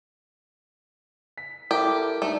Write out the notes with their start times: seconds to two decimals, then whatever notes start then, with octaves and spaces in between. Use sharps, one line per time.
1.38 B6
1.71 E4 G4 A4 A#4
2.22 G3 A3 D4 D#4